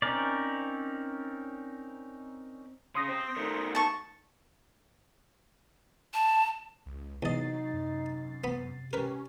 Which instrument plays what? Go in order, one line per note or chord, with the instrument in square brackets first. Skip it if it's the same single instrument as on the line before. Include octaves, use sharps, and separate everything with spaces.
[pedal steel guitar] C4 C#4 D#4 A#4 D5
[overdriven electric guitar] C#3 [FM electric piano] C6 D#6 A#6
[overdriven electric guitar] C4
D#3 A3
[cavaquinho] A5 C#6
[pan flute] A5
[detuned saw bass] C#2
[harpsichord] E2 D#5 [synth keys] C3 A6 C7 [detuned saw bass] F#3 [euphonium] D#4
[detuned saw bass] F#2
[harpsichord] B3 B5
[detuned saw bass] C#4 [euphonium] G4 [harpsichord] A#4 B4